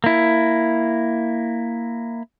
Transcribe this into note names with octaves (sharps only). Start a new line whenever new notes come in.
A#3 E4